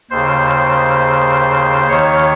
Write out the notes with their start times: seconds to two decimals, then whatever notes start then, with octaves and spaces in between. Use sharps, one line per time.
0.11 D#2 C#3 C5
1.88 D#2 D#3 C#5